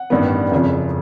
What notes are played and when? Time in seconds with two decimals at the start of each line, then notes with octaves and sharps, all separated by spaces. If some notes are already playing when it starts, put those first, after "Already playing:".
Already playing: F#5
0.10 A1 G2 D#3 G3 B3
0.51 F#1 F2 C#3 F3